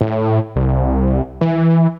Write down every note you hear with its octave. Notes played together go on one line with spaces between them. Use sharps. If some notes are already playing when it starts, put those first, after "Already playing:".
A2
C2
E3